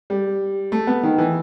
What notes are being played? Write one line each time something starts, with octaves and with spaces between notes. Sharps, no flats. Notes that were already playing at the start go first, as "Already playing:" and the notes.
G3
A3
B3
D#3
E3